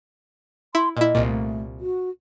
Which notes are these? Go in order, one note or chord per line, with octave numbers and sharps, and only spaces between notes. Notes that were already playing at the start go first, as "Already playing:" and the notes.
E4 C6
A#2 E4 D#5
C2 A#2
A3
F#4